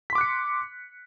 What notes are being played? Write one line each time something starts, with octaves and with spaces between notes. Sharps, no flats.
C6 D6 F#6 B6 C#7